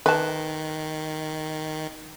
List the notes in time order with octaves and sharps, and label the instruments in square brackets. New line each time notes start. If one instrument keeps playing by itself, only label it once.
[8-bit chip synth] D#3 [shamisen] B4 A5